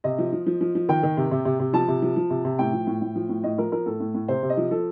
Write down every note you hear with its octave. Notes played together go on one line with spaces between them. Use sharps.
C3 D#5
F3
F3
F3
F3
F3
D#3 G5
D#3
C3
C3
C3
C3
F3 A5
C3
F3
F3
C3
C3
A2 G5
F3
A2
A2
F3
A2
A2 D#5
F3 A#4
F3 A#4
A2 A4
A2
A2
C3 C5
C3
D#5
F3
F3 A4